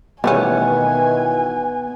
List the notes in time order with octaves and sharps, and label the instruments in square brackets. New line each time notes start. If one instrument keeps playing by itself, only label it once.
[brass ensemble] B2 D#3 E3 [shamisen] G3 A3 C#4 [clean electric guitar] B3 [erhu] G#5